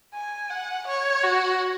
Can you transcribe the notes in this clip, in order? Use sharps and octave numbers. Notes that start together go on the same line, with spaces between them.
G#5
F#5
C#5
F#4